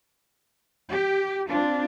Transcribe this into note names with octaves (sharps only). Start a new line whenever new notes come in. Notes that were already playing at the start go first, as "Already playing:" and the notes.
G4
C4 D4 F4